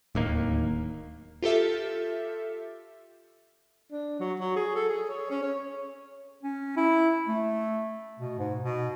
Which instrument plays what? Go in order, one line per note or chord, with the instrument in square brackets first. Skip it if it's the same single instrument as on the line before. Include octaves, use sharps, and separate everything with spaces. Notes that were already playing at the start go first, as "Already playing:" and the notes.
[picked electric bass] D1 D#2 A#3
[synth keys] F4 G4 A4 E5
[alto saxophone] D4
F#3
F#3
G#4
A4
G#4
C#5
C#4
C#5
[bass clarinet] C#4
E4
A3
B2
G#2
B2